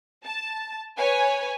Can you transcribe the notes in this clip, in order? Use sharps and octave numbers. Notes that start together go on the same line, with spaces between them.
A5
B4 C#5 G#5